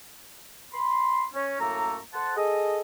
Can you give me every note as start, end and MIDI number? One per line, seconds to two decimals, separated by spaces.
0.72 1.23 83
0.72 1.23 84
1.33 1.59 61
1.59 1.97 42
1.59 1.97 45
1.59 1.97 57
1.59 1.97 58
1.59 1.97 69
1.59 1.97 82
2.13 2.33 69
2.13 2.33 72
2.13 2.33 78
2.13 2.33 81
2.36 2.80 68
2.36 2.80 69
2.36 2.80 75